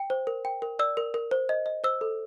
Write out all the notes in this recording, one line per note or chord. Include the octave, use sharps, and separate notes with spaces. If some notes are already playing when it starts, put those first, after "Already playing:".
Already playing: G5
C5
A#4
G5
A#4
D5 E6
A#4
A#4
C5
D#5
D#5
C5 E6
A4